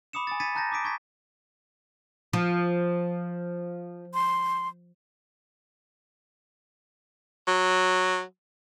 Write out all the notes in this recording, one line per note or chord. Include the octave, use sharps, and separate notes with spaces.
B5 D6 D#6 C#7 E7
G#5 D#6 A6
B5 G#6 A6 B6 C#7 D#7
A5 A#5 F#6 G6 A6 A#6
D6 D#6 B6 D7
C#6 G#6 B6
F3
C6
F#3